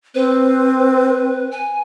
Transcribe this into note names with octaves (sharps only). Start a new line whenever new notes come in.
C4 B4 C5
G#5